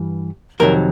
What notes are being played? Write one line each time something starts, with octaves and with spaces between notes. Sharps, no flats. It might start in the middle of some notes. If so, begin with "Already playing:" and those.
Already playing: G2 E3
F2 C3 D#3 F#3 A#4